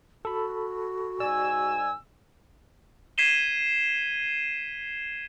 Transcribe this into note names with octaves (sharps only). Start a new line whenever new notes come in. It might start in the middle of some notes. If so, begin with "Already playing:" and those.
F#4 A4 B5
G#2 D5 G#5 E6
G#6 B6 C7 D#7 E7 G7